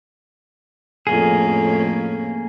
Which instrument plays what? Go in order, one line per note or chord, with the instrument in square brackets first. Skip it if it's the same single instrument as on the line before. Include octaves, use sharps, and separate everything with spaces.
[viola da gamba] F2 A2 C#4 [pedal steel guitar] A#3 G#4